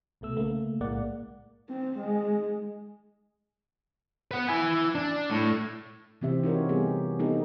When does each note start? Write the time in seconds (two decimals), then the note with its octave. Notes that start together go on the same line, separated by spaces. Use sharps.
0.21 C2 B2 A3 E6
0.36 C#3 A3 A#3
0.81 B1 A2 G#3 A#3 D5 F#5
1.69 C4
1.99 G#3
4.31 B4 F#5
4.48 E4 G#5
4.95 D4
5.31 A2
6.21 C3 E3 C4 G4 E5
6.44 D#4 F#4 A#4 C#5
6.69 G3 B3 D#4 G4 G#4
7.19 B3 D#4 G4 A4